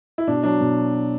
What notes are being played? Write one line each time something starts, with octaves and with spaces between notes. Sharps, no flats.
E4
B2 D4
F#3 D4
B2